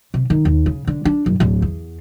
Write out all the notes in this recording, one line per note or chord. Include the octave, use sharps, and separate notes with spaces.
C3
D#3
D#2
C#3
D3
D4
F#1
D1
E2